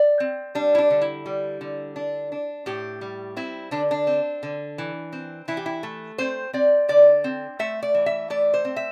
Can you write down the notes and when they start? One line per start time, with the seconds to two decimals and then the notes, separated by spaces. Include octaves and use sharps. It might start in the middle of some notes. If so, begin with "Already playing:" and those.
Already playing: D5
0.20 C4
0.55 G3 D4
0.75 E4
0.78 D4
0.90 D3
1.02 E4
1.26 G3
1.61 D3
1.96 D4
2.32 D4
2.66 A2 G4
3.01 G3
3.37 C4 E4
3.71 D3 D4
3.91 D4
4.07 C4
4.43 D3
4.78 E3
5.13 C4
5.48 E3 E4
5.57 G4
5.66 E4
5.83 A3
6.18 C4 C5
6.53 C4 D5
6.89 D3 D5
7.24 C4
7.59 A3 E5
7.83 D5
7.94 E3
8.06 E5
8.30 A3 D5
8.54 C5
8.65 C4
8.76 E5